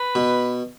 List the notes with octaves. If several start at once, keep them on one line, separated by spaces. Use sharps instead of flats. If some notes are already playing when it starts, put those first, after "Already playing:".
Already playing: B4
B2